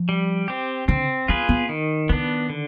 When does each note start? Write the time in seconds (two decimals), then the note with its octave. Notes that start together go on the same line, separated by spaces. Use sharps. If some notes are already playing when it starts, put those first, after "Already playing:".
Already playing: F3
0.09 G3
0.48 C4 G4
0.88 D3 C4
1.28 B3 F4 G#4 B4
1.49 B3
1.69 D#3
2.09 D#3 B3 D4
2.49 D3